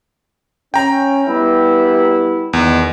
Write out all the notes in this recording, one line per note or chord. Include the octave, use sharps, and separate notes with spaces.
C#4 G5 A#5
G3 B3 E4
E2 D#3